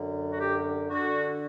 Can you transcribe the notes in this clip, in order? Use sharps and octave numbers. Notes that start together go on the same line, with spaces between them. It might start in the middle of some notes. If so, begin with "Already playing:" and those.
Already playing: F#2 D3
F#4
G4
D3 F#4